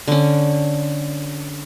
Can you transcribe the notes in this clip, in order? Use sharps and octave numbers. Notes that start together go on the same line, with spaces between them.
D3 C#4